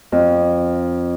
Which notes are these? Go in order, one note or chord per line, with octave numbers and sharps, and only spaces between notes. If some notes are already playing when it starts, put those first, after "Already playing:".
F2